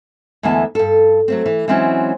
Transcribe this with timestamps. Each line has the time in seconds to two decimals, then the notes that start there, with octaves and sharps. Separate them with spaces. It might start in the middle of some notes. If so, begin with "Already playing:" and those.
0.43 D2 E3 G#3 B3 E5 A5
0.75 G2 A4
1.28 F#3 A3 C4
1.46 E3
1.68 E3 F#3 G#3 C4 C#4 E4